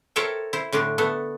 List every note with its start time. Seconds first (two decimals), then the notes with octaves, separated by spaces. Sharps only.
0.16 A4 A#4 C5 C#5 E5 G5
0.53 E4 C5
0.72 A2 D3 A3 D4
0.98 A3 B3 A4